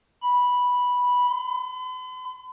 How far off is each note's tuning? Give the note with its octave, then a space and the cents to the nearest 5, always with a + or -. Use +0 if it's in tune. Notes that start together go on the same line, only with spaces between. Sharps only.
B5 -10
B5 +45